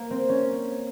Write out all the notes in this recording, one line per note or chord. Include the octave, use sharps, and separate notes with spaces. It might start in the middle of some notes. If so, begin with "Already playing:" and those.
Already playing: A#3
C4
C#4